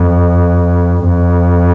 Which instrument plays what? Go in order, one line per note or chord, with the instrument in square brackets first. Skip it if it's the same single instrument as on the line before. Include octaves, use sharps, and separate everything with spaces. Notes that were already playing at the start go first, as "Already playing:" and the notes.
Already playing: [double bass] F2
F2